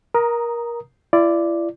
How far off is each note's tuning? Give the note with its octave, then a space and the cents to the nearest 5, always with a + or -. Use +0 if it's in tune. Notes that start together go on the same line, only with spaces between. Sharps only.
A#4 +20 A#5 +0 D#6 +0
E4 +40 D5 +0